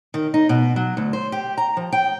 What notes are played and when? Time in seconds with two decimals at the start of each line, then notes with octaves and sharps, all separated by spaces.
0.14 D#3
0.34 D#4
0.49 B2
0.76 F#3
0.97 D2
1.13 C5
1.32 G4
1.58 A#5
1.77 F3
1.92 G5